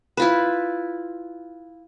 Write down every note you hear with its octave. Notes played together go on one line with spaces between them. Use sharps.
E4 F4 B4